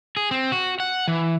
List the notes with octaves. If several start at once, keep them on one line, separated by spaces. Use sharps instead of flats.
G#4
C4
F#4
F#5
E3